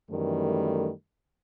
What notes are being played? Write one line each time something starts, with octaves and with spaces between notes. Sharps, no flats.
F#2 D#3 E3 G3 A3